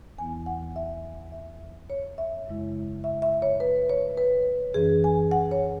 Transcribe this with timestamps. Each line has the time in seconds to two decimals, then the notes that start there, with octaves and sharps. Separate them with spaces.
0.18 E2 E3 B3 E4 G#5
0.46 F#5
0.76 E5
1.32 E5
1.90 C#5
2.18 E5
2.46 F#2 C#3 G#3 E4
3.04 E5
3.22 E5
3.42 C#5
3.60 B4
3.89 C#5
4.17 B4
4.74 F#2 E3 C#4 G#4
5.04 G#5
5.31 F#5
5.51 C#5